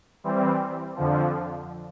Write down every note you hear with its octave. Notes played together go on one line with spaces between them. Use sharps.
E3 G3 C4
F2 D3 F3